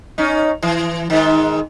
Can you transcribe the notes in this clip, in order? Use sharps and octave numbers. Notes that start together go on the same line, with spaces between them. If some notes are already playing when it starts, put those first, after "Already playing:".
C#4 D#4
E3
G#2 D#3